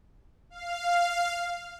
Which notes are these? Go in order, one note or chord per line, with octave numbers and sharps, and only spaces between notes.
F5